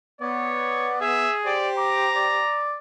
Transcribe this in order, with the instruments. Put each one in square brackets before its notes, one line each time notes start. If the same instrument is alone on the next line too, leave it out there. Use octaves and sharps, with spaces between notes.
[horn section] B3 [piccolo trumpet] C#5 [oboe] D5
[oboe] G#4 [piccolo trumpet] E5
[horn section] G4 C5 [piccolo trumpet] D5
[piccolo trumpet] A#5 [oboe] D6
[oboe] D5